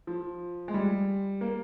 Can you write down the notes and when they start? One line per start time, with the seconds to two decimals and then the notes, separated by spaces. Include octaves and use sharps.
0.07 F3
0.68 G#3
0.74 G3
1.41 A#3